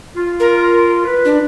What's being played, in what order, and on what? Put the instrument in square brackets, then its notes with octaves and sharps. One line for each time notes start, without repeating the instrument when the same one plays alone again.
[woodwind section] F4
[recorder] A#4
[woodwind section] B4
[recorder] D4